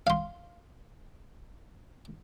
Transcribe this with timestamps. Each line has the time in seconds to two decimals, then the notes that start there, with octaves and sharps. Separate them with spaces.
0.07 F5 C6